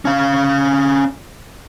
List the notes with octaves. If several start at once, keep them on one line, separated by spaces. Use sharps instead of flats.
C#4 F5